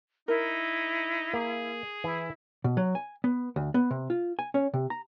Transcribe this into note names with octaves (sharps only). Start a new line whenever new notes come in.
D#4 E4 A#4
A#3 G#4
E3 E4
B2
F#3
G#5
B3
D2
B3
C3
F4
G#5
C#4
C3
A#5